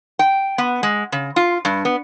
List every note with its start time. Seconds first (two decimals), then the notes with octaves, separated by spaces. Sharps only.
0.19 G5
0.58 B3
0.83 G#3
1.12 C#3
1.36 F4
1.65 G2
1.85 B3